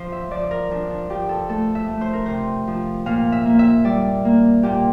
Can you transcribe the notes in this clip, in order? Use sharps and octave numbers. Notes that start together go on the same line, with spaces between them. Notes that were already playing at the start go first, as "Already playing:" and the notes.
Already playing: F3 C5
E5
F3 D5
A#4
F3 D4
D4
F3 G4
A4
A3 A4
E5
A3
C5
A#4
C3 C5
F3
A#2 F5
E5
A#3
E5
G3 D5
A#3
A#2 G4